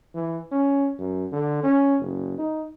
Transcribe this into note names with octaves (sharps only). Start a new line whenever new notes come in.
E3
C#4
F#2
D3
C#4
F#1
D#4